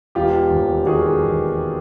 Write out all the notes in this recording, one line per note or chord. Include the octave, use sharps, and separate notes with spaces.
E1 F4 G4
D#2
D#3 F#4 G#4
E1